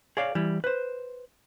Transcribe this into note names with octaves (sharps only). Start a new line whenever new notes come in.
G#4 C#5 D5 F5
E3 G3 E4
B4 C5